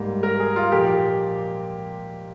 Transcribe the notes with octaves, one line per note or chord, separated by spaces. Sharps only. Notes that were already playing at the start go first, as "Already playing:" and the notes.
Already playing: G#2 G3 A#3
A#4
G#4
F4
A#2 F3 A#3 G4